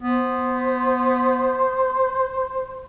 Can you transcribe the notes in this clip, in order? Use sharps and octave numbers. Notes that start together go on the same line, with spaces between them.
B3 C5